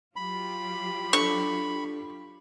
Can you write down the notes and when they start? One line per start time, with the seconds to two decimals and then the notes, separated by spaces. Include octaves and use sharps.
0.16 F#3 F4 G4 B5
1.13 D4 A4 C#6